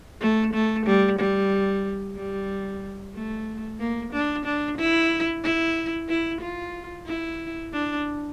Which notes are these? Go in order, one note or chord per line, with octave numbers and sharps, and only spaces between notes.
A3
A3
G3
G3
G3
A3
A#3
D4
D4
E4
E4
E4
F4
E4
D4